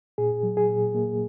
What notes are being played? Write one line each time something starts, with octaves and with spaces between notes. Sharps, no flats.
A#2 G#4
F#3
G#4
A#2
A#3